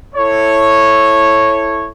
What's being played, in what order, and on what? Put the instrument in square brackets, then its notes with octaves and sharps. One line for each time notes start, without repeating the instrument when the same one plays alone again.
[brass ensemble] E4 A4 C#5